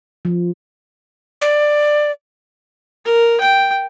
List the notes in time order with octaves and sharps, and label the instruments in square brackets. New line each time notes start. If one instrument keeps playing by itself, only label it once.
[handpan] F3
[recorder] D5
[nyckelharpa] A#4
G5